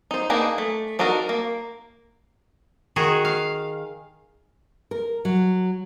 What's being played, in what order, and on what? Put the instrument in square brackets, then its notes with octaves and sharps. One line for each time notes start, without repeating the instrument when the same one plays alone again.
[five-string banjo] D#4 C5
A#3 D4 D#4 G#4 B4
A3
D4 D#4 F#4 A4 A#4
A#3
[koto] D#3 F#4 G#4
F5
[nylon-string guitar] A#4
F#3